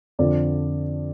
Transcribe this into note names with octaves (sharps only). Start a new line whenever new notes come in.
F2 D3 F3 D5